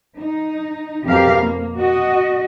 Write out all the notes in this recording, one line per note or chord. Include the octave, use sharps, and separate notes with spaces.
D#4
F2 B2 G4 A#4 F5
A#3
F#4 D#5